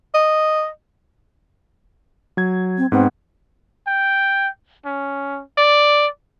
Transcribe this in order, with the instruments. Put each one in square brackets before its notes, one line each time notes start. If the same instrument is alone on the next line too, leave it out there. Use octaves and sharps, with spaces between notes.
[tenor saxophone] D#5
[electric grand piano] F#3 G#6
[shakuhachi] C4
[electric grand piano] G#2 B3 F#5 [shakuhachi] C4
[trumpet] G5
C#4
D5